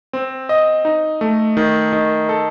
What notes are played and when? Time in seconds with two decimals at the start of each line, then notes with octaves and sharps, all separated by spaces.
0.13 C4
0.49 D#5
0.85 D#4
1.21 A3
1.57 D#3
1.93 D#3
2.29 A4